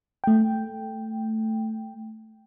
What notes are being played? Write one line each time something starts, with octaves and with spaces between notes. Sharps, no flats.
A3 G5